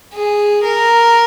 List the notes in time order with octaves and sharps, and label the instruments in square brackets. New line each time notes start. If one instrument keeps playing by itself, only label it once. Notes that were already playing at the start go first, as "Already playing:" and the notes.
[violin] G#4
A#4